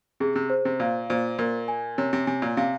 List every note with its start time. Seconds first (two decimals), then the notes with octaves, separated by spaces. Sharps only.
0.20 C3 G#4
0.36 C3
0.50 C5
0.65 C3
0.80 A#2 F5
1.10 A#2 C5
1.39 A#2 A#4
1.68 G#5
1.98 C3 C#5
2.13 C3
2.27 C3 G#5
2.42 A#2
2.57 C3 F5